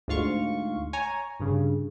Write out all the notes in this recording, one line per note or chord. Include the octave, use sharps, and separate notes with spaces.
D2 G#2 F4 F5 C#6
C#5 G#5 A#5
G2 C#3